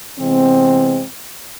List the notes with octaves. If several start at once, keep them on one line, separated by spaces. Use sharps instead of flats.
C3 E3 G#3 B3 C4